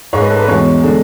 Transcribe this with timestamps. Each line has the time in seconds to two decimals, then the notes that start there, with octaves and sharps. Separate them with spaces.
0.13 G#2 G#3 C#5
0.21 B4
0.30 A4
0.39 B4
0.47 E2 B2 G#3 C#5
0.83 D3 G#3